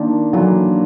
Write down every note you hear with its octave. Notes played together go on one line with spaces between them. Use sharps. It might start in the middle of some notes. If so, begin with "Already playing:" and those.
Already playing: D#3 A#3 D4 F4
E3 F#3 A#3 D4 F4